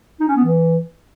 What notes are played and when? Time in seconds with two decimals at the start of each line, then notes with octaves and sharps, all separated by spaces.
0.20 D#4
0.28 C#4
0.36 B3
0.44 E3